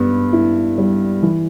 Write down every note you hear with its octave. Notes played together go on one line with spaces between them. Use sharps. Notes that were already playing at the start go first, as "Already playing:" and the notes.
Already playing: G2 B3
E4
G3
E3